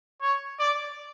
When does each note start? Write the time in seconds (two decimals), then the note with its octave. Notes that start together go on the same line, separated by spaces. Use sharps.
0.22 C#5
0.59 D5